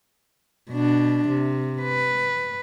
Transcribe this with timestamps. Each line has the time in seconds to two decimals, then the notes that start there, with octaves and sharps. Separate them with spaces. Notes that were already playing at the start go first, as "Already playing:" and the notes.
0.72 B2 D4
1.29 C3
1.82 B4